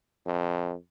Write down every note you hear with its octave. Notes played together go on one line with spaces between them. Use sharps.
F2